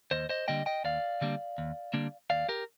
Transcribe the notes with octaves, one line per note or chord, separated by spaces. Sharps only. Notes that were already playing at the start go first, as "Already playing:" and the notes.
D#2 C5 D#5
C5 D#5
D3 G3 A#3 D4 D#5 G5
D#5 G5
D#2 D5 F5
D3 G3 A#3 D4
D#2
D3 G3 A#3 D4
D#2 D5 F5
G4 A#4